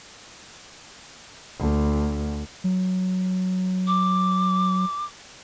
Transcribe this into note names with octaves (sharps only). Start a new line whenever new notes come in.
D2
F#3
D6